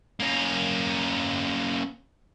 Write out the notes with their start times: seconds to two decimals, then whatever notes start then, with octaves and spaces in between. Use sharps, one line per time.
0.20 A#3 C#4